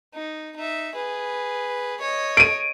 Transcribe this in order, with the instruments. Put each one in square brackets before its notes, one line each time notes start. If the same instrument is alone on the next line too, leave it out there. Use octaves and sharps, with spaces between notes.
[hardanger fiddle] D#4
D#4 E5
G#4 B4
C#5 D#5
[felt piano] D7 D#7